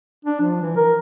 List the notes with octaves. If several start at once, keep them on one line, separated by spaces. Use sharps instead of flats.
D4
F3
E3
A#4